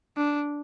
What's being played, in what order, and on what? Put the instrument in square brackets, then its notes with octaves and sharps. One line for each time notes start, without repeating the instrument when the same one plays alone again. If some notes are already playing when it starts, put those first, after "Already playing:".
[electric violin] D4